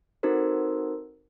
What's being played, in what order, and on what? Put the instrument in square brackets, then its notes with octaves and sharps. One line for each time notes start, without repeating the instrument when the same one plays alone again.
[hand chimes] C4 D#4 F#4 A4 A#4 C5